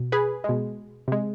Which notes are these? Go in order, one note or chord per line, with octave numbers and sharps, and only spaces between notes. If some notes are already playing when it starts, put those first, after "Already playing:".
Already playing: B2
G#4 B4
B2 G#3
C3 G#3